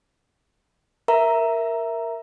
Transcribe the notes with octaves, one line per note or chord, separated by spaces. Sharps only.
A#4 E5 A#5